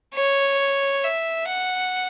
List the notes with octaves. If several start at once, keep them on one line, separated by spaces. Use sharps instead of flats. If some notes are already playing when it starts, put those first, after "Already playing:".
C#5
E5
F#5